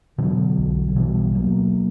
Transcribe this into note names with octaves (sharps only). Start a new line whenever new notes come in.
B2 D3 F#3
B1
F#3
B2 E3 G3
B2 F#3 A#3